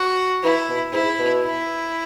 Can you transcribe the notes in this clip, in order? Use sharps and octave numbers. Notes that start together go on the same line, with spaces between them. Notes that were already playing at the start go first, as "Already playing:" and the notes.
Already playing: F#4
E3 E4
B2
G#2 E4
B2
E4